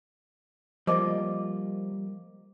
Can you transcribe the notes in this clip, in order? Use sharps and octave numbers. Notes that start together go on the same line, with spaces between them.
F3 G3 A#3 F4 C5 D#5 D6